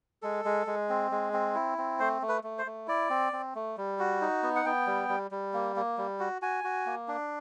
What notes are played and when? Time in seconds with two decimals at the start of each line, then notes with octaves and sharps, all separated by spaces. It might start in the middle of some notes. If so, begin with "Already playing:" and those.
0.22 G#3 A4
0.45 G#3
0.67 G#3
0.89 C4
1.11 G#3
1.33 C4
1.55 E4
1.78 C4
2.00 A3 C5
2.22 A3
2.29 B4
2.43 A3
2.59 C5
2.66 A3
2.88 E4 D5
3.10 C4
3.33 C4
3.55 A3
3.77 G3
3.99 F#4
4.21 D#4
4.43 B3
4.56 F#5
4.65 B3 G5
4.87 G3
5.09 G3
5.31 G3
5.54 A#3
5.76 A#3
5.98 G3
6.19 F#4
6.42 F#4 G#5
6.64 F#4
6.86 A#3
7.08 D4